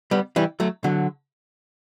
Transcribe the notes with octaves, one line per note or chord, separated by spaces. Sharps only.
G3 B3
E3 G3
F#3 A3
D3 F#3